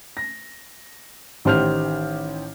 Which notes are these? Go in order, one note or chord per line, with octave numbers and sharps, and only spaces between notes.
A#6
A1 D#3 G4 C5 F6 F7